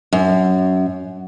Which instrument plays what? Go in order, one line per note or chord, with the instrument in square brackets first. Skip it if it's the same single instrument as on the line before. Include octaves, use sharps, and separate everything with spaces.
[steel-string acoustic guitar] F#2